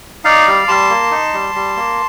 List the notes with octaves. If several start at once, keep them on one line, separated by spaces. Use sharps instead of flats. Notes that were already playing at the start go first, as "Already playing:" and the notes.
D#4 D5 F5
G3
G3 A5 C6
A#3
D#4
G3
G3
A#3